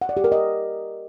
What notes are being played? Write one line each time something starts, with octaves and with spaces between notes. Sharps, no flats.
F#5
D5
G4
A#4
D#5